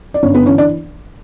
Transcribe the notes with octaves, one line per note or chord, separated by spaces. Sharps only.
D5
G1 C#4 C#5
B3 B4
E3 C#4 C#5
D4 D5